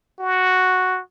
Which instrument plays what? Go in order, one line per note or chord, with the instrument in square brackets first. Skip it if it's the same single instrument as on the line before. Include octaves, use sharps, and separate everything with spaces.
[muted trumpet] F#4